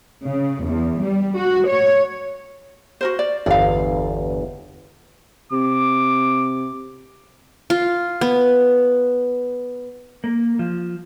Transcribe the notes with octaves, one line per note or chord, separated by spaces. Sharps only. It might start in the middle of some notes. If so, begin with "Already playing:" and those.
C#3
E2
G3
F#4
C#5
F#4 A#4 C5
D5
G1 E2 D5 F5
C3 D6
F4
B3
A#3
F3